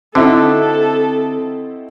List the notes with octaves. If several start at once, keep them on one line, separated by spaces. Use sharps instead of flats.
D3 C4 D#4 E4 F#4 A4 E5